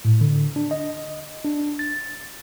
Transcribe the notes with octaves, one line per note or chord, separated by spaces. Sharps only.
A2
D3
D4
D#5
D4
A6